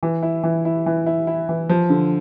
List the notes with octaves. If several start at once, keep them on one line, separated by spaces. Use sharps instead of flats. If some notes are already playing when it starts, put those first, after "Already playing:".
E3
E4
E3
E4
E3
E4
E4
E3
F3
D3